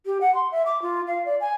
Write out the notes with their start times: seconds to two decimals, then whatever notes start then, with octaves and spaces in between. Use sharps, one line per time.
0.06 G4
0.21 F#5
0.34 C6
0.52 E5
0.66 D6
0.82 F4
1.07 F5
1.26 D5
1.40 G#5